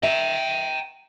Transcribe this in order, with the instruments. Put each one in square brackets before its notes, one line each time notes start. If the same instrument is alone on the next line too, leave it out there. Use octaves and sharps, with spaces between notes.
[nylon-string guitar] E5 [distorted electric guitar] G5 A#5